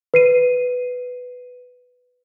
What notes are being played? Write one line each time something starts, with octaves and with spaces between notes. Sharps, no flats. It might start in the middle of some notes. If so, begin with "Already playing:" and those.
B4 C7 D#7